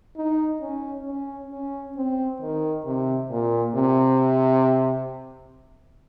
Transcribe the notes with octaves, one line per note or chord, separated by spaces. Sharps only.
D#4
C#4
C#4
C#4
C4
D#3
C3
A#2
C3